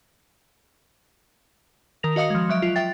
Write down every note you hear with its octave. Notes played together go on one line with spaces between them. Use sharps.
D#3 A#4 A#6 F7
F#4 D#5 F5 D#6 C#7
F3 G#3
F#3 E5 D7
F4
E5 G5 A6